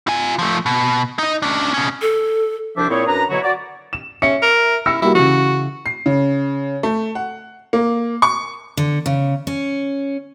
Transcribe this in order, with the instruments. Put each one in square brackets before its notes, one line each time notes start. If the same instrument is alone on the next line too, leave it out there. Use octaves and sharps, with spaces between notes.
[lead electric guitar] F4 G#5
F3 A3
B2
D#4 D#5
C#4 D4
B2 C#4
[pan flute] A4
[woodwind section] C2 F3 D4 C5 E5 D6
A#2 C4 E4 G#4 C#5
F#2 D4 B4 A#5
B2 D3 F#3 E4 F#4 C#5
F#4 D5
[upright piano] E7
[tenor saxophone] C#4 [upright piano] E5 C#7
[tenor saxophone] A#4
[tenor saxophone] E4 [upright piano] E6 A#6 C#7
[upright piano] G3 A#3 F#4 [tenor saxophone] E4
[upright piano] C#3 E3 [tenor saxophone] F#4
[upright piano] C7
C#3
A3
F#5
A#3
C#6
[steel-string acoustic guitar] D3
C#3
C#4